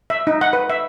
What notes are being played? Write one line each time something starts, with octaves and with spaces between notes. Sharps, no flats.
E5
D#4
F#5
B4
E5